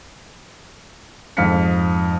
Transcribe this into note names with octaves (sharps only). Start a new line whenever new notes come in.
F2 G#2 F5 F6 B6 C#7